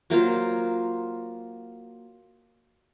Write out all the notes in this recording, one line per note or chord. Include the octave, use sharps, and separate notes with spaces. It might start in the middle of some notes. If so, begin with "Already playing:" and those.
F#3 A#3 F4 C5